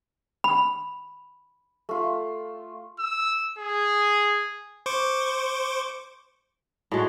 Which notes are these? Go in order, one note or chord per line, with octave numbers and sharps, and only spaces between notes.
B5
A3 F4
E6
G#4
C5 C#6 D6
A2 G#3 F#4